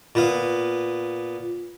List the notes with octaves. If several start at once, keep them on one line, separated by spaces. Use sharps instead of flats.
A#2 B3 F5